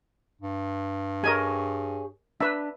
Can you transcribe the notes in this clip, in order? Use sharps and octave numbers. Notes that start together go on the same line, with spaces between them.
G2
G4 G#4 A#4 C#5 D#5 G#5
D4 B4 E5